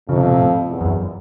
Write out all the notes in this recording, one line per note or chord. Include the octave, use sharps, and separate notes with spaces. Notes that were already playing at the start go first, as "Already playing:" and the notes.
F2 C#3
C3
B2
C3
A2
E2
F2
F#2